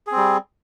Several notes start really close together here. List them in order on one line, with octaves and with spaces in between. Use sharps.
G#4 C4 G3